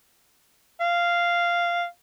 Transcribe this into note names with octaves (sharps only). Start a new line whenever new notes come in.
F5